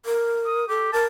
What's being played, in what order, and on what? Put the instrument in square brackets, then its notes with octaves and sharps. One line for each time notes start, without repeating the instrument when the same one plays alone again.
[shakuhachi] A#4
[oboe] D#6
[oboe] G4 [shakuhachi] A4
[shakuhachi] A#4 [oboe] A5